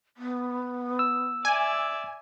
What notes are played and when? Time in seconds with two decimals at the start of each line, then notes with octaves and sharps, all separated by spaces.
0.17 B3
0.99 E6
1.45 D5 E5 G#5